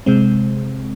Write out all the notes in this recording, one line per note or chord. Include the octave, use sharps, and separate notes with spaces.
C3 G#3 C4